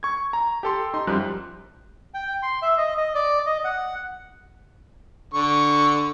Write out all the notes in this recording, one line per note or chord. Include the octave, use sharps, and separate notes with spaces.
C#6 G#6
A#5
G4 A4 C6
D#4 C6
F#2 F3 G3 F#6
G5
C6
E5
D#5
D#5
D5
D#5
F#5
D3 C#6